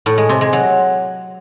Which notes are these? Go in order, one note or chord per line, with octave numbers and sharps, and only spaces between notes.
A2
G#3
C3
G#3
F#3